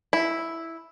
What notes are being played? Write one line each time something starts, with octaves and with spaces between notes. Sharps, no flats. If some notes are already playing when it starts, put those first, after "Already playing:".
E4